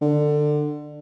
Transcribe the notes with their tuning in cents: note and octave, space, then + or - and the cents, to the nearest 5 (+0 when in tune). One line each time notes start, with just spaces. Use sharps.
D3 +20